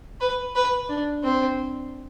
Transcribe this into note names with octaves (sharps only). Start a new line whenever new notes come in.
B4
B4
D4
C4